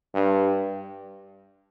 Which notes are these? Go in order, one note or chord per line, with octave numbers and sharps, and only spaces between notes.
G2